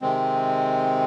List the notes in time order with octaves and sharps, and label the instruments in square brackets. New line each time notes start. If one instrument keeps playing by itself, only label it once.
[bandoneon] C3 D#3 G#3 C4